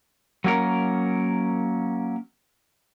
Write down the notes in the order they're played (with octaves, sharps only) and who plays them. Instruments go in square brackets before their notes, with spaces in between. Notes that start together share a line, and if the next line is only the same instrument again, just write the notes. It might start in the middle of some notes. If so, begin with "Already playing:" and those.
[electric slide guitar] F#3 A#3 C#4 A#4